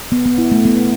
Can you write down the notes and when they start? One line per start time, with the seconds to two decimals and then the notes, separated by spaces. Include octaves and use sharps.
0.12 B3
0.26 B3
0.38 E4
0.52 A3
0.65 B3